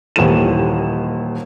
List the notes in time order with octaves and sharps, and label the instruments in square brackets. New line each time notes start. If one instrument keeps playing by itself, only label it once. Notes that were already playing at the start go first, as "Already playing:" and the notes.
[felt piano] D#1 D#2 A2 E3 A3 E7